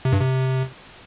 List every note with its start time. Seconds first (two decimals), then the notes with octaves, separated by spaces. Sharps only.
0.05 C3
0.13 G2
0.20 C3